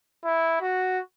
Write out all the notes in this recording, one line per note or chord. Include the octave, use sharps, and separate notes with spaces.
E4
F#4